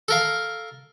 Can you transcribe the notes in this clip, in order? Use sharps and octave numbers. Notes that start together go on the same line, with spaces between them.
A4 A#4 F5